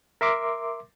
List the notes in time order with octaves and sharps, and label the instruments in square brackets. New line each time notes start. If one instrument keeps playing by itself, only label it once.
[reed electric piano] A#4 E5 C6 D6